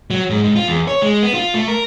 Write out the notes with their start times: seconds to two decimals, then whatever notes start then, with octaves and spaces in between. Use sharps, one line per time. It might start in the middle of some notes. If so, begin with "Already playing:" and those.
0.10 F#3
0.30 G#2
0.43 G#2
0.56 F4
0.68 E2
0.88 C#5
1.02 G#3
1.22 B3
1.34 F4
1.54 A3
1.68 A#4